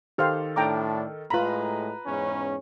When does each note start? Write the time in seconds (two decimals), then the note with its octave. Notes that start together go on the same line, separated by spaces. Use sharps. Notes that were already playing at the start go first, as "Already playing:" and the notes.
0.18 D#3 G4 A4 C5 F5 F6
0.56 A2 D4 G5 A#5 D6
1.30 A2 G#3 F4 B4 A#5 B5
2.06 E2 G#2 C#4